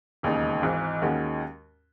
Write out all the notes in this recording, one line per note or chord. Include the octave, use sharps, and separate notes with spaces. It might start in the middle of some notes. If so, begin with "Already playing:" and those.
E1 D#2 C#3 G#3 D#4
G#1 G#2 E3
D#2 D#3 G#3 C#4 F#4